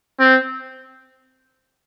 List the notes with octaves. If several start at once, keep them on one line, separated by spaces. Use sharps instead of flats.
C4